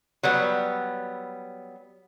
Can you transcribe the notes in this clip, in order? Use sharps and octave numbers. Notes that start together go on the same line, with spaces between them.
F#3 G3 B3